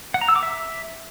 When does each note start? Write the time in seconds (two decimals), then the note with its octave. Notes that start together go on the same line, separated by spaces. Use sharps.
0.14 F#5
0.21 A#5
0.29 E6
0.36 D6
0.43 E5